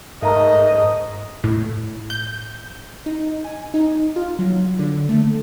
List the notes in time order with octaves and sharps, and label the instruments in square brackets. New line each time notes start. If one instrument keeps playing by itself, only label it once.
[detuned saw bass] G#2 [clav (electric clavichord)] A3 A#4 [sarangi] D#5
[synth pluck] A2
G6
[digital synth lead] D#4
G#5
D#4
F4
F#3
D3
A3